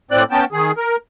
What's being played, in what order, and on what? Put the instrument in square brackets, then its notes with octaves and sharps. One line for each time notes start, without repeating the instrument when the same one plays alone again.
[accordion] A2 C4 D5 F#6
B3 C#4 G5 A5
D#3 G#4
A#4